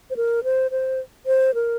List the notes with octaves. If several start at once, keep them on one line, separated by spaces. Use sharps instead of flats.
C5
A#4
C5
C5
C5
A#4